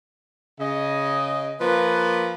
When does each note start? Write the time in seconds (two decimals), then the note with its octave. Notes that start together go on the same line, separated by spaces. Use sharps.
0.59 C#3 D#5
1.61 F3 A#3 B4